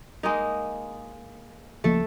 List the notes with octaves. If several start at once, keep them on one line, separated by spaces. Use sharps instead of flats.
G#3 A#3 D#4
C#2 F3 A3 A#3 A4